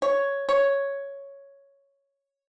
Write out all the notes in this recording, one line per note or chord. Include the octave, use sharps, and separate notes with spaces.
C#5
C#5